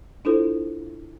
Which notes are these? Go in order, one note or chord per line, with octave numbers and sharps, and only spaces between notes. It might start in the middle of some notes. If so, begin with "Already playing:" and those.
D4 E4 F4 A4 C5